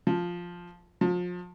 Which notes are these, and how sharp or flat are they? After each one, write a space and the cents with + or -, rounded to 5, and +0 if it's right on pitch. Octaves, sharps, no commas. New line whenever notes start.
F3 +5
F3 +35